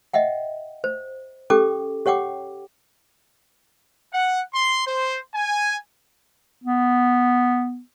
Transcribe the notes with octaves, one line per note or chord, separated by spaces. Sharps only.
D#5 E5 F#5 G5
C5
C#4 G4 A4 G5 D6
G4 C#5 F#5 G5 D6
F#5
C6
C5
G#5
B3